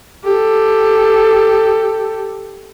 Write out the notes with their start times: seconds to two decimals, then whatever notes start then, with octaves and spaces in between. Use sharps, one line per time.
0.24 G4 A4